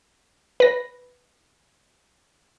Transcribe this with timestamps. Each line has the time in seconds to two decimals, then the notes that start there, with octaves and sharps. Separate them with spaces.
0.60 B4 A#6